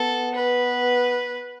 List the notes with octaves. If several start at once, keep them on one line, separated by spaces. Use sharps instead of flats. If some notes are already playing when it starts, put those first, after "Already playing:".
Already playing: B3 A4
B4